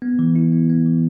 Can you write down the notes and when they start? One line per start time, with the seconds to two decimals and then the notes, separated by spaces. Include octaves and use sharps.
0.02 B3
0.19 E3
0.36 E4
0.52 B3
0.70 B3
0.86 E3